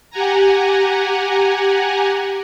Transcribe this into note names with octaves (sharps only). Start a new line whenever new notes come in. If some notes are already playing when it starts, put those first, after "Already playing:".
G4 F#5 G#5 A#5